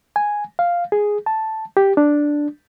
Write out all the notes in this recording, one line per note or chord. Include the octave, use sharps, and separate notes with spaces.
G#5
F5
G#4
A5
G4
D4